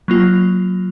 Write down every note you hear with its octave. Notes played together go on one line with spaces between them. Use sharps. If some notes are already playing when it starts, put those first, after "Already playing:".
F#3 A#3 F4